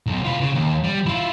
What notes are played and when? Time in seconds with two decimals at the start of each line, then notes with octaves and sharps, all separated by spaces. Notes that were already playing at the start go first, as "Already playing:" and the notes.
0.06 B1
0.24 F4 B4
0.40 C#3
0.54 D#2
0.84 G3
1.06 E4 F4